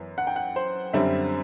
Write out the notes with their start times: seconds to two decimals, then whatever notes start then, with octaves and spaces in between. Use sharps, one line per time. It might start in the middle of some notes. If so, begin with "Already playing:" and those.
Already playing: F#2 E3 B3
0.18 F#5
0.27 G5
0.36 F#5
0.56 C5
0.93 F#2 D3 G3 C4 E5